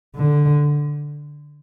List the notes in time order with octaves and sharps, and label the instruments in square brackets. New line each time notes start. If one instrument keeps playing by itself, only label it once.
[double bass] D3